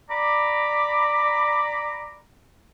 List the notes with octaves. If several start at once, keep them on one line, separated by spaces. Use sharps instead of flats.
D5 A#5 B5 D6